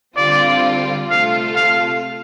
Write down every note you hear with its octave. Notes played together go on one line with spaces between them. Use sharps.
D3 G3 C4 F4 D5
C3 A3 F4 A4 F5
F5